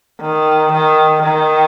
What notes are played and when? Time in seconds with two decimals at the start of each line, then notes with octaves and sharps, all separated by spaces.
0.21 D#3
0.72 D#3
1.24 D#3